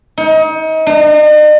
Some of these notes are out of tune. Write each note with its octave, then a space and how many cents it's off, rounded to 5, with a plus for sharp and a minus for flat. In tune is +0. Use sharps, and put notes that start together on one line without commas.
D#4 +30
D#4 -45